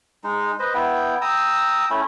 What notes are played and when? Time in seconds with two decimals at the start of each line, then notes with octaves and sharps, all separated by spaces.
0.24 G#3 D#4
0.59 B4 C5 D#5
0.74 B3 E4 G5
1.21 G5 A#5 D#6 E6
1.90 A3 C#4 E4